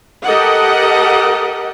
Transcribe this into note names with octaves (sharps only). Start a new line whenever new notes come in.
G4 A4 A#4 D#5 F#5